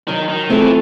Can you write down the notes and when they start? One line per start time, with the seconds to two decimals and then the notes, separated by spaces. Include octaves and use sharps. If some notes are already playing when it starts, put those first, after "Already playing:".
0.08 D#3 F#3
0.29 D#3
0.49 E3 A3 C4 F4 A4